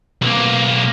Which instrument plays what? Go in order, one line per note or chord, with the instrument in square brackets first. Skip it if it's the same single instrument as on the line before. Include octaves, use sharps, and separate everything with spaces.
[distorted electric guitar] B1 A#3